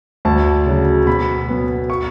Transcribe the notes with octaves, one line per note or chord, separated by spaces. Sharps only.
D2 A5
C#3 F#3
B2 B5
F#3 B3
C#6